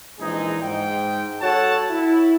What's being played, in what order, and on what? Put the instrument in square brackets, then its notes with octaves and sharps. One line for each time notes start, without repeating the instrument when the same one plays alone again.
[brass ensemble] A#1 E3 G#3 D#4 G#4
G#2 G5
F#4 A4 C#5 F#5 A5
E4